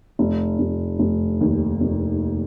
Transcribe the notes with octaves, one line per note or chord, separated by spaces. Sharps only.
F1
F1
F1
D#2
F1